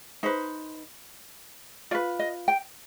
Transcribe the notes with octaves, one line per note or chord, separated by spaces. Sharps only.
D#4 B4 C5
F4 B4 D5
D#5
G5